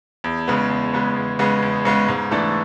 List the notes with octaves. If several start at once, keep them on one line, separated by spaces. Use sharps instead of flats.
E2
C#3 G#3 B3
E2
C#3 G#3 B3
E2
C#3 G#3 B3
E2
C#3 G#3 B3
G#2
E3 A3 D4 A4